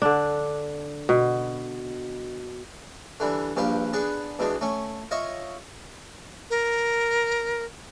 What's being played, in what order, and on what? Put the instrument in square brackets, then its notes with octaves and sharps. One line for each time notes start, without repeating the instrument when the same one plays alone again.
[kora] D3 D4
B2
[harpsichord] D3 E3 G3
A#1 G2 G4 B4 F5
B3 D4 G#4 B4
E2 B2 G#3 D4
A3 C#4
F4 C#5 D#5 E5
[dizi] A#4